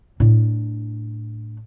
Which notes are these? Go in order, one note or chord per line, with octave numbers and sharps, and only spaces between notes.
A2 D4